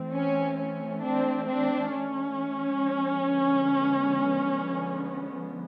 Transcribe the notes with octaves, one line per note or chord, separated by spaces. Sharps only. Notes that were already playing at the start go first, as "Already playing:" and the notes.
Already playing: E3 A3 C4
C#4
C#4
C4 D4
C4 D4
C#4
D3 F3 G#3 B3